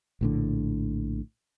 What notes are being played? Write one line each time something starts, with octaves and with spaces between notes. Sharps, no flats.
A#1 A2 D3